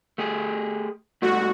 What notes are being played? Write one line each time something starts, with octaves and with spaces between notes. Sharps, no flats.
A3 G4 G#4
G#2 G3 A3 F#4